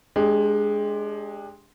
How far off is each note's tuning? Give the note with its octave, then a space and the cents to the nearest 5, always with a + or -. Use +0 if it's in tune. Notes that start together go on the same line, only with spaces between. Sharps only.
G#3 +10 D4 -15 G4 +30